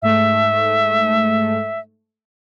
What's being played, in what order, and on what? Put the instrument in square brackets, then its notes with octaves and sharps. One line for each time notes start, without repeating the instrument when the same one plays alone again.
[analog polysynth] G#2 A3 [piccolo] E5